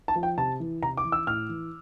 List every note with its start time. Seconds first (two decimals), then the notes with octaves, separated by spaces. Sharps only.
0.08 A5
0.16 F3
0.23 G5
0.38 C3 A5
0.60 E3
0.83 C3 A#5
0.97 D6
1.05 E3
1.12 E6
1.27 A2 F6
1.49 E3